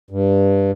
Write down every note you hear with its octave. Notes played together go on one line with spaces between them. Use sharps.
G2